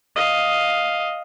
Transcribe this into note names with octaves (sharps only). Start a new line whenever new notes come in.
D#5 F5